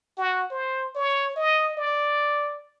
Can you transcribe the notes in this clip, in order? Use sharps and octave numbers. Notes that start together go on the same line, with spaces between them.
F#4
C5
C#5
D#5
D5